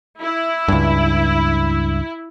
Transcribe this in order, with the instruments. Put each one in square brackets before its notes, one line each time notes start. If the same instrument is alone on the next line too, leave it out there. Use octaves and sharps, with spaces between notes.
[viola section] E4
[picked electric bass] C#2 G2